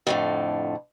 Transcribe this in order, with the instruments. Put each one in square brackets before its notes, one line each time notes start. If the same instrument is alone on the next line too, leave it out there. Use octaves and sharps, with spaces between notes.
[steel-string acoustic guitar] F2 A2 D3